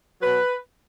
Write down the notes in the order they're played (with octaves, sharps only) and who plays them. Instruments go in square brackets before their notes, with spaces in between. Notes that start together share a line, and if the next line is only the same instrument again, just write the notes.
[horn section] B2 F#3 B4